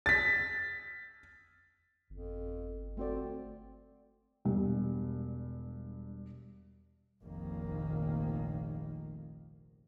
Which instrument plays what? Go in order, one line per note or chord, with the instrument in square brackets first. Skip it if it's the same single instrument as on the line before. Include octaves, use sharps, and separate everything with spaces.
[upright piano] A6 B6
[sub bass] G1 [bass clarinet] F2
[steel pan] A3 F#4 D5 [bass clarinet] C4
[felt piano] E1 G2
[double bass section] F1 A#1 D#3 A#3